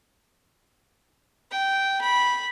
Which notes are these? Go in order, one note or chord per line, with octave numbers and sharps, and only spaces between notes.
G5
B5